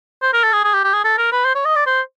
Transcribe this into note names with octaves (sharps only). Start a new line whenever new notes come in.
C5
A#4
A4
G#4
G#4
G4
G4
G#4
A4
A#4
B4
C5
C#5
D#5
D5
C5